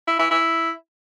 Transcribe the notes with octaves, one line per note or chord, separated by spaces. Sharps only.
E4
E4
E4